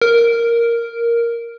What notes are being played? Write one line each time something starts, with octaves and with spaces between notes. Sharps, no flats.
A#4